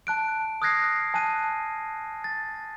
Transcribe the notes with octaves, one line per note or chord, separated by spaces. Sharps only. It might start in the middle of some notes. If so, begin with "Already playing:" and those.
A5 F#6 D7
D#6 F6 F#6 G#6 A#6 C7
G#5 A5 F#6 D#7
A6